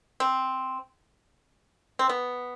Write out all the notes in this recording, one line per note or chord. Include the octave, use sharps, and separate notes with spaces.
C4
C4
B3